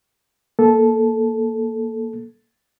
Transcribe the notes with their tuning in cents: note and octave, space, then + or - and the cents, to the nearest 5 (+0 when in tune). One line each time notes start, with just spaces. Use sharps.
A#3 +0 A4 -10